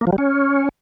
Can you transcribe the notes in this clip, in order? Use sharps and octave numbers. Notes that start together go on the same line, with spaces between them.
A#3
F3
G3
C#4